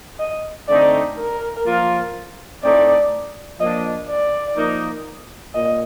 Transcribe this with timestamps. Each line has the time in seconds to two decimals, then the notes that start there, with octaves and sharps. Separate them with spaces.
0.20 D#5
0.68 D3 A3 C4 D#4 D5
1.17 A#4
1.66 F3 A#3 F4
2.63 A2 A3 C4 D#4 D5
3.60 F3 A#3 D4 D#5
4.08 D5
4.57 F3 A#3 D#4
5.55 A#2 D#5